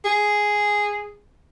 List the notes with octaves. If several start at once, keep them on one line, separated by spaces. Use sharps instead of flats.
G#4